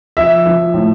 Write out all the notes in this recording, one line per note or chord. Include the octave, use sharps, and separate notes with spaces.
F3 E5
F3
A2